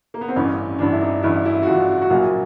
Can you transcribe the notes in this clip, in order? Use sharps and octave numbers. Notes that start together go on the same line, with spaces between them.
A#3
B3
C4
A1 G2 E3 C#4
A1 G2 E3 D4
E4
D#4
A1 G2 E3 E4
E4
F#4
A1 G2 E3 F4
F#4
A#1 A#2 F#3 F4